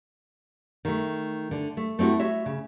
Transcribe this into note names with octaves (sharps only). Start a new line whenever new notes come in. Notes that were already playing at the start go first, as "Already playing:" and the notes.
D#3 A3
D3
A3
A3 C4 E4 F#4
F#4 C#5 E5
C#3